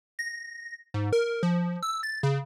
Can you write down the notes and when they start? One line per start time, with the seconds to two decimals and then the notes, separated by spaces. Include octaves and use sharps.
0.19 A#6
0.94 G#2
1.13 A#4
1.43 F3
1.83 E6
2.03 A6
2.23 C#3